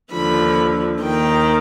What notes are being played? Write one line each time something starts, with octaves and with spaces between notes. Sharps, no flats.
D#2 D3 F3 B5
D#2 D#3 G5